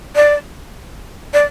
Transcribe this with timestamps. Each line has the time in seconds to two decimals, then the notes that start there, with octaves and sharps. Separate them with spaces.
0.16 D5
1.34 D5